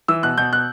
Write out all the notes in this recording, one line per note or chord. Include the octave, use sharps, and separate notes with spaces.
E3 E6
B2 F#6
B2 G6
B2 F#6